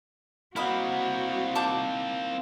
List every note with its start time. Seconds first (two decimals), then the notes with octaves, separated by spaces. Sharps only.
0.56 A#3 C4 E4 F#4 D#5 F5 F#5 B5
1.55 D#3 A5 D6 G6